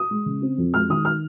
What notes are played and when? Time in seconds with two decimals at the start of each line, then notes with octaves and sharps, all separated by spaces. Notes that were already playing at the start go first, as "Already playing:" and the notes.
Already playing: D#6
0.11 G#3
0.26 C#3
0.42 C4
0.58 F2
0.74 G#3 F6
0.89 D#3 D#6
1.05 F6